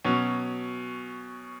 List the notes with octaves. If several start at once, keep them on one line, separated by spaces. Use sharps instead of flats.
B2 F#3 C#4